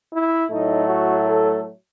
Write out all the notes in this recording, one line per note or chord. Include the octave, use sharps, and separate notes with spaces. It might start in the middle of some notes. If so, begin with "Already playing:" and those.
E4
A2 F#3 A3 D#4
F#4
A4